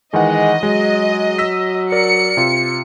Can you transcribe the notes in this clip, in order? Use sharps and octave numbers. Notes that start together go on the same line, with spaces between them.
D#3 E3 G#3 D#5 F#5
F#3 G#3
E6 A#6 B6
A#4 D5 C#7
C3 F4